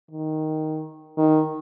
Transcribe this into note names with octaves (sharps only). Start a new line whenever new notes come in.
D#3
D#3